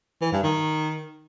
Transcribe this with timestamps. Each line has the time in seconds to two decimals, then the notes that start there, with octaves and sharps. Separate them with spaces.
0.21 E3
0.32 G2
0.43 D#3